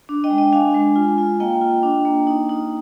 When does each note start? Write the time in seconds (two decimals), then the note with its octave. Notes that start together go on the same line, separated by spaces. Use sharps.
0.09 D4
0.24 D#5 G5
0.30 G#3
0.38 D#5 G5
0.53 D4 F5 G#5
0.74 G#3
0.96 F4
1.18 F4
1.40 A#3 D#5 G5
1.61 F4
1.83 D4
2.05 A#3
2.27 D#4
2.49 D#4